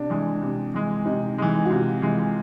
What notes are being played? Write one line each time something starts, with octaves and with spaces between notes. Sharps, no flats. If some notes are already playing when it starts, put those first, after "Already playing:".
Already playing: C3 D4
E3 G#3
C3
E3 G#3
C3 D#4
E3 G#3
F#4
C3 F4
E3 G#3